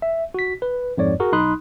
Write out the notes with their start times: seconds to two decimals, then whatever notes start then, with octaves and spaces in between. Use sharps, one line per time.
0.02 E5
0.34 F#4 B6
0.62 B4
0.98 F2 G#2 C#5 D5
1.20 F#4 G#4 A#4
1.32 B1 D#4 B5 C6 D#6 F#6